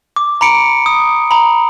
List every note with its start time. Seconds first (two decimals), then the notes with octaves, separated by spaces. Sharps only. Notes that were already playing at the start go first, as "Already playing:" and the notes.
0.16 D6
0.41 A#5 B5 C#7 D7
0.86 D#6
1.31 A#5 B5